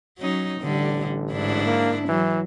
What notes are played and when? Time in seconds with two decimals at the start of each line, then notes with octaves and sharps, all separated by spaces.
0.18 F#3 C#4 D#4
0.60 A1 D3 G3
1.32 G#2 D4 E4
1.66 A#3
2.08 E3 F#3